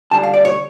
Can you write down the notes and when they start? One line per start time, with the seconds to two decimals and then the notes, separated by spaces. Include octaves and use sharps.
0.11 D3 G3 D4 A5
0.23 F5
0.34 D5
0.45 C#5